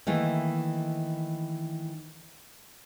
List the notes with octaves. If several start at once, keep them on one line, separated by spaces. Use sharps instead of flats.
D#3 E3 A3 A#3